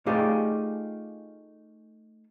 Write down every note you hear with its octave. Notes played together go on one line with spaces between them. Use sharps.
A3 D#4 F4 G4 G#4 D5